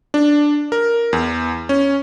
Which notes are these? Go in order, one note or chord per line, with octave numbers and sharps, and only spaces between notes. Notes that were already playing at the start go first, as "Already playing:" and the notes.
D4
A#4
E2
C#4